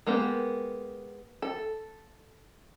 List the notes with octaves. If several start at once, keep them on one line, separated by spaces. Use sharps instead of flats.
G#3 A#3 B3 G4
A4